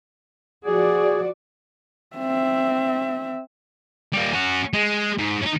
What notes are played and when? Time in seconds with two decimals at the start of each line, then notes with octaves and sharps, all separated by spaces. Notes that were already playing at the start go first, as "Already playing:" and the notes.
0.65 F3 F#4 G#4 D5
2.16 C4 E5
4.13 G3 A#3
4.32 C#4 F#4
4.73 G#3
5.19 G#2
5.42 C#4 D#4